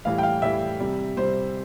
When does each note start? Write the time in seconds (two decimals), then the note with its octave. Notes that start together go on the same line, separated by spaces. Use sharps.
0.05 A2 E3 G3 F5
0.18 G5
0.23 F5
0.42 A2 E3 G3 E5
0.80 C3 G3
1.17 C3 G3 C5